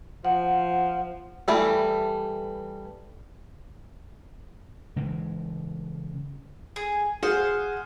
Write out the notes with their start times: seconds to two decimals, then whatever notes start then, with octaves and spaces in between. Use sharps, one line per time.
0.25 F3 F#5
1.48 E3 G3 A3 A4
4.96 C#3 E3 G#3
6.76 G#4
7.23 G#4 C5 F5 F#5